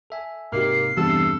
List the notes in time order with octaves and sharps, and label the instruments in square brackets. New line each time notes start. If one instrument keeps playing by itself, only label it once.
[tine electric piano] A4 E5 G#5
[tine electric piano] G#2 C3 D#4 [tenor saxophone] A#3 [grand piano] G4 F6 [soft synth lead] C7
[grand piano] E2 G2 C3 [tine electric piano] E3 G3 B3 [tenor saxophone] A4